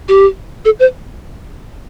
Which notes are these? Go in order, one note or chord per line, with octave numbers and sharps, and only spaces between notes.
G4
A4
C5